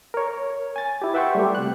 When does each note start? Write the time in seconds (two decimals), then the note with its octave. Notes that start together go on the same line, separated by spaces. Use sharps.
0.14 A#4 C#5
0.76 G#5 A6
1.02 E4 G4
1.14 B4 E5 F#5 G5 C6 C#6
1.35 G3 A3 G4
1.55 C3 F#6